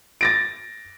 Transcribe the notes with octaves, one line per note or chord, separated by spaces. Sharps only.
A6 A#6 D7